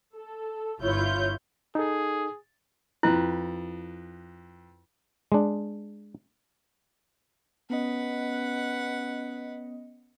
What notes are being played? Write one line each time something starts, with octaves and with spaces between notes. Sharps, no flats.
A4
G1 E4 F4 C#5 G6
D#4 G#4 A4
F2 E4 B4 F#6
G#3 D4
B3 C#4 B4 D#5 F#5